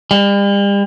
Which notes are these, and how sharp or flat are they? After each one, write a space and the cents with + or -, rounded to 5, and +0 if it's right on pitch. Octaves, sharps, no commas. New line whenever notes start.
G3 +40